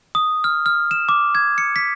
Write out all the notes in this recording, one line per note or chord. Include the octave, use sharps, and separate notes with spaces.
D#6
F6
F6
E7
D6
G#6
C#7
B6